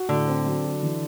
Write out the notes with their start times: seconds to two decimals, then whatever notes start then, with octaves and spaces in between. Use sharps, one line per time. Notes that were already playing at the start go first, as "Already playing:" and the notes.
Already playing: F#4
0.09 A2 D3
0.27 C4
0.46 F#3
0.64 F#4
0.83 E3